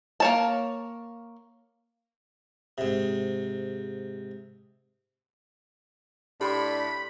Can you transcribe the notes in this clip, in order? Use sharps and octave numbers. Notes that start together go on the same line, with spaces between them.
A#3 C#5 A5
G#2 C3
A2 D4 G4 B5 C6